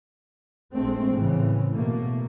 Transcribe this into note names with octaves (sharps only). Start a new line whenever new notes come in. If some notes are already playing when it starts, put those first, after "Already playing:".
A#1 G#3 A3 C4
A2 C#3 E3
B2 A3 A#3